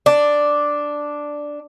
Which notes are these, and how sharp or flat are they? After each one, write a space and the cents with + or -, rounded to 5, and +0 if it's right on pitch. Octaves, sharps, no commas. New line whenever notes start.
D4 +0 D5 +0